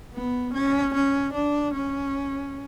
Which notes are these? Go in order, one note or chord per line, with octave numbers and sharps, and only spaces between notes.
B3
C#4
C#4
D4
C#4